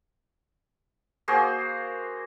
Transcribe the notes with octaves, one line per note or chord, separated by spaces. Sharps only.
A#3 F#4 G#4 C5